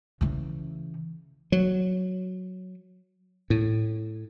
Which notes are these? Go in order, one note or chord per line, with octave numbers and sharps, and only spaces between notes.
C#3 E3
F#3
A2